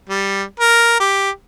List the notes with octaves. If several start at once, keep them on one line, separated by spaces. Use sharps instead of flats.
G3
A#4
G4